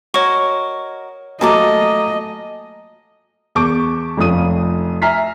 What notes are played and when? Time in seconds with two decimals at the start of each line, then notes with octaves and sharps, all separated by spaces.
0.14 F#4 A#4 C#5 D#5 C#6
1.41 F#3 A3 A#3 D#5 G#5 A5 D6
3.55 E2 A5 C#6 D6 G6 D7
4.18 F1 F2 C#4 F4 D#6 D#7
5.02 E5 G#5 A#5 F6 B6 C7